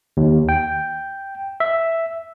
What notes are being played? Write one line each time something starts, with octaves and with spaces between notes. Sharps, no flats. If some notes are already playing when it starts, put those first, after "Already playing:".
D#2
G5
E5